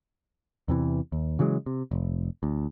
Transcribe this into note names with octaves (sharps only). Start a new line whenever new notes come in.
E2 C3 E3
D#2
C#3 E3 F#3 G#3
C3
F1
D2